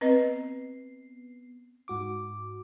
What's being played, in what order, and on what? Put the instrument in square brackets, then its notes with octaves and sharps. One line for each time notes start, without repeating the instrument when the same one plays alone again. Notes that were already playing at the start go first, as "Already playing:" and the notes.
[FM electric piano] B3 C7 [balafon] C4 B4 D#5
[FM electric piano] G#2 F#4 D6